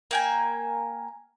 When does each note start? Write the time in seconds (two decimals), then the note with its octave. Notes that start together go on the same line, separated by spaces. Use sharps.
0.11 A#3 G5 G#5